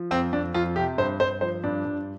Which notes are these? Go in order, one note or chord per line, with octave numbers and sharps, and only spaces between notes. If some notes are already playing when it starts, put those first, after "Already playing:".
Already playing: F3
F2 C4
F2 D4
F2 F4
C3 G4
G2 C5
G2 C5
F3 C5
G2 D4
G2